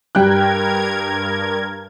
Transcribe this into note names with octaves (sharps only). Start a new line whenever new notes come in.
G2 G3 A#4 G5 F#6 G#6